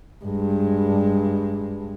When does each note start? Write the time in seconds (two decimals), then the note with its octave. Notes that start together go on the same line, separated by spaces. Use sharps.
0.25 G2 G#3